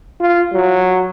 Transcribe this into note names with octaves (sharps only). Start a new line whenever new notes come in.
F4
F#3